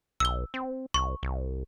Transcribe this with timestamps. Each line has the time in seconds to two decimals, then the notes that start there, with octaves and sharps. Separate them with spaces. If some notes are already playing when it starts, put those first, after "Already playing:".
0.20 B1 E6 G7
0.54 C4
0.94 C2 C#6
1.23 C2